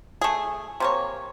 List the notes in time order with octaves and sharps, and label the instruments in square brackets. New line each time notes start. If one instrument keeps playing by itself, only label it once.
[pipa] A3 G#4
C3 A#3 C#5